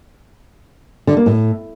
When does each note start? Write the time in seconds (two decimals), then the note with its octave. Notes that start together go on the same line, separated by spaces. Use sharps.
1.07 D3
1.17 A#3
1.26 A2